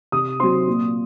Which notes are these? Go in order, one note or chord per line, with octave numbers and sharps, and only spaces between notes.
C3 D#6
F#3 C4 C6
A#2